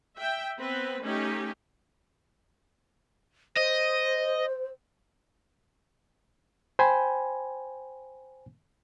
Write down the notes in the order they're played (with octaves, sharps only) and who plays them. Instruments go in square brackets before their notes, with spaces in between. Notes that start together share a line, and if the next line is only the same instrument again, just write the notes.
[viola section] E5 G5
B3 C4 B4
A3 C#4 D#4 G4
[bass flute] C5 [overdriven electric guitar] D#5
[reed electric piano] C5 G5 G#5 B5